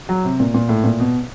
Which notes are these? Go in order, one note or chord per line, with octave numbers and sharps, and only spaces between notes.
F#3
C3
A#2
A#2
A2
A#2
B2